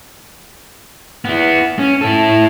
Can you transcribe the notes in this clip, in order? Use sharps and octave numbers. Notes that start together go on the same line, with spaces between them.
B3 E4
C#4
E4 A4